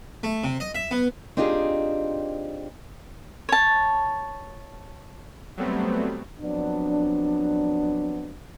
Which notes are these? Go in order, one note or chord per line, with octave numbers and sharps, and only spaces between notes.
A3
C3
D#5
E5
B3
C4 D4 D#4 F4 G4 G#4
C#5 A5
F#3 G3 A3 B3 C4
F3 F#3 B3 C4 D4